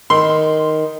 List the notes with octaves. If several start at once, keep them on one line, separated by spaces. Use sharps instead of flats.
D#3 C6